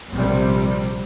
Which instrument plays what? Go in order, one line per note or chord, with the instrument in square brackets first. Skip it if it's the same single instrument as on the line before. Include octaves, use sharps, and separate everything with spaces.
[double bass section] A#1 C3 G3